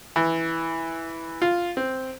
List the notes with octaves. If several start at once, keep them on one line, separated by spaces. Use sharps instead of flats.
E3
F4
C4